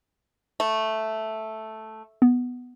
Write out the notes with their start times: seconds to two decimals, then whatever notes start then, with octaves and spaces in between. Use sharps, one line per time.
0.60 A3
2.22 B3